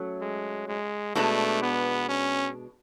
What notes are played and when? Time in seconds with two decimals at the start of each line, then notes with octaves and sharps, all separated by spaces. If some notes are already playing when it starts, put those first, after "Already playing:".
Already playing: F#3 A3 C#4
0.21 G#3
0.68 G#3
1.15 B2 G#3 A3 D4
1.62 B3
2.08 C#4